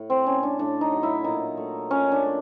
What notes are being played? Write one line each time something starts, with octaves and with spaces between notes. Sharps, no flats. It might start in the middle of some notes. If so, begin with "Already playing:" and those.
Already playing: A2
C4
A3 C#4
D4
A2 D4
D#4
F#3
E4
A#2 D#4
A3
A#2 C#4
D4
A3